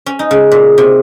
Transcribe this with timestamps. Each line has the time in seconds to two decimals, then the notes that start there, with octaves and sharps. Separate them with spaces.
0.06 C#4
0.19 D#4
0.31 C#3
0.52 A#2
0.78 C3